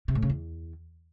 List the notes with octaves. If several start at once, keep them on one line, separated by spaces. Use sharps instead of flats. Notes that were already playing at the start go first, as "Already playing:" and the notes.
C3
A2
C#3
E2